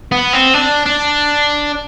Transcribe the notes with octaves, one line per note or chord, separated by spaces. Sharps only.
B3
C4
D4
D4